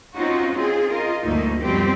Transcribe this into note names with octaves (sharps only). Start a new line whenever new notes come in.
C4 C#4 D#4 F4 F#4
C4 F4 G#4
F4 A#4 D#5
D2 G2 A3 A#3 D#4
F#2 B2 F3 G3 C4 G4